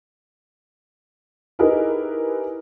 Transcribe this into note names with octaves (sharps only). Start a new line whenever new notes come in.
D#4 E4 G4 G#4 A#4 B4